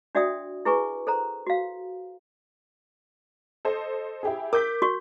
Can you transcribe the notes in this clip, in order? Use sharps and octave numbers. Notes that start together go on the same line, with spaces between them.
D4 F#4 D5 E5 G5 D#6
E4 G#4 B4 G#5 C#6
A4 C5 A#5
F#4 F5
A4 C5 D#5
E4 G4 G#4
A#4 D6 G6 B6
F#4 C#6